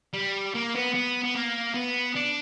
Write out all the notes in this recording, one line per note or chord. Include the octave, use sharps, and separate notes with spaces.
G3
A#3
B3
B3
B3
A#3
B3
D4